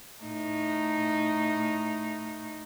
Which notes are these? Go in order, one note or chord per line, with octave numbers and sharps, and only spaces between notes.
A2 D#4